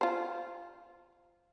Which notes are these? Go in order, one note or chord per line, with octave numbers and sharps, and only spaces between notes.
F4 C5